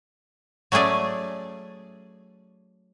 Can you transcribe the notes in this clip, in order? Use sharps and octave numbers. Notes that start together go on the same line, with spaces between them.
F#3 A3 C#4 G#4 D5